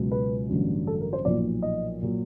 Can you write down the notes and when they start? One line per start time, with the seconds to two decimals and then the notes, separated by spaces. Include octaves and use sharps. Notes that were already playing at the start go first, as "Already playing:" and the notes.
Already playing: C#2 B2 F#3
0.12 B4
0.49 A1 G2 D3 F#3
0.87 A4
1.01 A#4
1.13 C5
1.25 B1 A#2 F3 D5
1.62 D#5
2.02 A#2 F#3